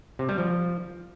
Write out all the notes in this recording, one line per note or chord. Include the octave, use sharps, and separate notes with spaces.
C3
G3
F3